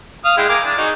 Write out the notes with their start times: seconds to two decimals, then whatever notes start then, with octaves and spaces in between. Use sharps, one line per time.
0.25 F5 D#6
0.37 G#3 E4 G5
0.49 A#3 G#5 D6
0.65 D4
0.78 D#4 F#4 G#4